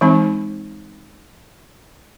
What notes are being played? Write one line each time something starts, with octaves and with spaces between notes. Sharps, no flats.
E3 G#3 C4 D#4